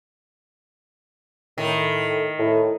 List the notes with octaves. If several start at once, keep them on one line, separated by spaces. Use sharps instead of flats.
A2 D#3
A2